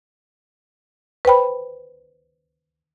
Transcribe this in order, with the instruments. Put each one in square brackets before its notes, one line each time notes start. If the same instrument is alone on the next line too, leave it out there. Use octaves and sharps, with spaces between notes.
[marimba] B4 C5 G5 B5